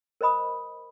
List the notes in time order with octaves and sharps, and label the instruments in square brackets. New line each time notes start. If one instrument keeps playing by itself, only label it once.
[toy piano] A#4 C5 D#5 B5 D#6